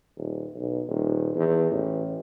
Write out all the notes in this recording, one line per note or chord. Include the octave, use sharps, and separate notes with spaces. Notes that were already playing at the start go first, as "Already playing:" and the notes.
D#1
B1
D#1
E2
A1